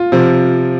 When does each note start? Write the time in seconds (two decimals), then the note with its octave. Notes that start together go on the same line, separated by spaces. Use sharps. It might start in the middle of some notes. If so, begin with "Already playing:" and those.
Already playing: F4
0.12 C3 F3